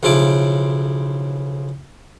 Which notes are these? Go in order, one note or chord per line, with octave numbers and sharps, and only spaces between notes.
B1 C#3 F3 E4 A5 D6